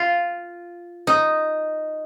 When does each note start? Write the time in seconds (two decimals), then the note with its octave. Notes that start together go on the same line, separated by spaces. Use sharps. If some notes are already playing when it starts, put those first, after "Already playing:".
Already playing: F4
1.07 D#4